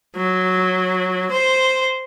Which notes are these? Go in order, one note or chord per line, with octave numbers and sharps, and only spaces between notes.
F#3
C5